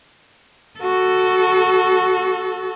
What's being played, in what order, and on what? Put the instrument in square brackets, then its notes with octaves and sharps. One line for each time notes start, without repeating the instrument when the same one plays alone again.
[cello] F#4 A4